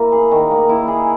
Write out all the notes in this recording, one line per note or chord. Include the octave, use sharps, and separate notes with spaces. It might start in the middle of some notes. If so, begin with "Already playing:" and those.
Already playing: A#3 E4
G#4
D#3
A#3
E4
G#4